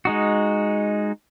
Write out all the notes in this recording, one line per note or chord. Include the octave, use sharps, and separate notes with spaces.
G#3 D#4 F#4